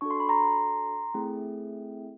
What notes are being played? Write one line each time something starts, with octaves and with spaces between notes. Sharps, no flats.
D4 F#4 A4 C#6
C6
B5
A#5 C6
A3 C4 E4 G#4